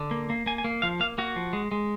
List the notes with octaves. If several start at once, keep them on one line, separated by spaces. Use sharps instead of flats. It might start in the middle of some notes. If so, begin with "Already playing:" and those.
Already playing: D3
A#3
A#3
A#3 G#5
G#5
A#3
F3 F5
A#3 F5
A#3 F#4
F3
G#3
G#3